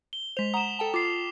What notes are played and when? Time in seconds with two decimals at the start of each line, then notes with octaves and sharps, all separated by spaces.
0.13 G7
0.37 G#3 C5 B6 F7
0.54 F#5 A#5 D#6 E7
0.79 A4 G5 A5
0.94 F4 D6 C7